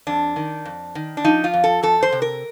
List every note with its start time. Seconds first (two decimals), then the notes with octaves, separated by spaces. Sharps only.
0.07 F2 D4
0.36 D#3
0.65 F2
0.95 D#3
1.17 D4
1.24 F3 D#4
1.44 F4
1.54 F2
1.64 A4
1.83 F2 A4
2.03 C5
2.12 C3
2.22 A#4